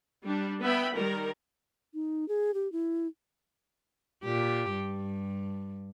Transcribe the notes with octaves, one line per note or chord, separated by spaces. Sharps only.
G3 D4
B3 E5 G5 B5
D#3 G3 A#4
D#4
G#4
G4
E4
A#2 G4
G2